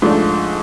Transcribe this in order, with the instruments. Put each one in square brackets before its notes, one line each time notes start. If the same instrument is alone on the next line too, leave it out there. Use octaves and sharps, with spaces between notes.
[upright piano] G#2 F3 A3 D4